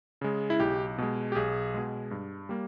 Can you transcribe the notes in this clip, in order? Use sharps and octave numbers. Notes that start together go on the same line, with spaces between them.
C#3 G#3
E4
B1 G4
B2 G#3
G4
B1 G#4
B2 G#3
G2
G3 A#3